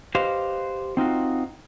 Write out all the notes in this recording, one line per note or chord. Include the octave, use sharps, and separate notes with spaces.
G4 B4 C5 D#5 F5
C4 D#4 F4 F#4